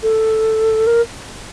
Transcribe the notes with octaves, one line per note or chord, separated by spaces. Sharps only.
A4
A#4